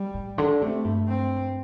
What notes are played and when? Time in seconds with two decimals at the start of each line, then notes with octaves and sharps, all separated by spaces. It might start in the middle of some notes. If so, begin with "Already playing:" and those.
Already playing: G3
0.14 A2
0.38 D3
0.62 C3 A3
0.84 G2
1.08 C4